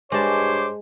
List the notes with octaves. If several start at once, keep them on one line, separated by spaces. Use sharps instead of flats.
G2 G#3 C5 C#5 A5 D6